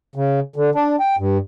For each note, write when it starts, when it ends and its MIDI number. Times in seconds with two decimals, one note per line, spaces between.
0.16 0.40 49
0.56 0.70 50
0.75 0.96 62
1.00 1.16 79
1.18 1.38 43